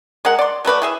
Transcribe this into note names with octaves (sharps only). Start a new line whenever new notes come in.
G#3 A#4 F#5
D5 C6
F#3 A3 B4 D5
E4 G#4 E5